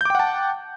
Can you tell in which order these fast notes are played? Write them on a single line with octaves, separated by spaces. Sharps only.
G6 D6 G5 F#5 A5